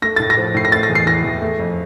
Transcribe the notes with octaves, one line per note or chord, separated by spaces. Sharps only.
A3 A#6
A2 A6
A#6
F3
A2 C7
A#6
A3 A6
A#6
E2
C7
E3 A#6
E2
A3
F2